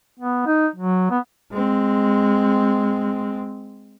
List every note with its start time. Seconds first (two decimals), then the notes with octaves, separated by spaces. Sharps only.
0.20 B3
0.46 D#4
0.76 F#3
1.10 B3
1.52 G#3 C4